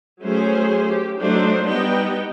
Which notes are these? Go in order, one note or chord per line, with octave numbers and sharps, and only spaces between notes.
F#3 A3 C#4 G#4 C5
G4
F#3 A3 D4 D#4 C5
G3 B3 D#4 D#5 G5